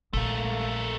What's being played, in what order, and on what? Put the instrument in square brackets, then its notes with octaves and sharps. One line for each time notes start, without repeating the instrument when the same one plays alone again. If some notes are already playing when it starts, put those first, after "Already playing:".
[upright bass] A#1 [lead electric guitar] A3 A#3